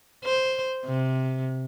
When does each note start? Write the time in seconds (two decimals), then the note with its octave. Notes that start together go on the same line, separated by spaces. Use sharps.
0.24 C5
0.85 C3